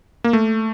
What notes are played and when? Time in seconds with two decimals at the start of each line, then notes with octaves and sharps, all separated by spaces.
0.24 A#3
0.33 A3